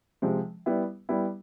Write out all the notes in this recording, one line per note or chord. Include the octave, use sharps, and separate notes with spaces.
C3 F3 G#3
G3 B3 E4
G3 B3 E4